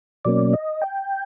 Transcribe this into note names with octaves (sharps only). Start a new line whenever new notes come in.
B2 F#3 A#3 C#4 D5
D#5
G5